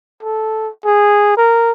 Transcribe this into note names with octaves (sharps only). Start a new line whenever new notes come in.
A4
G#4
A#4